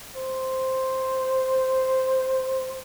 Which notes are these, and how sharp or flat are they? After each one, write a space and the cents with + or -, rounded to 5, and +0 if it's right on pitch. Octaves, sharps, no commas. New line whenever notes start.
C5 +0